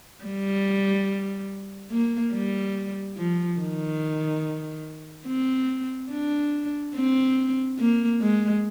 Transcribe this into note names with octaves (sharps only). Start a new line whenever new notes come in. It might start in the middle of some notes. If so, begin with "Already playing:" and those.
G3
A#3
G3
F3
D#3
C4
D4
C4
A#3
G#3